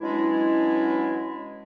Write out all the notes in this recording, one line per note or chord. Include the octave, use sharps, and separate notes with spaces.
E3 F#3 G#3 C#4 D4 E4